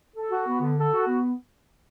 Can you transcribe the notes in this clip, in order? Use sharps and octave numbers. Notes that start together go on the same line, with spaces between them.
A4
F#4
B3
D3
A4
F#4
B3